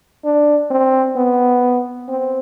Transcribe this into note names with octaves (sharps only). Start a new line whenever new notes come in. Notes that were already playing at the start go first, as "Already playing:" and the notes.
D4
C4
B3
C4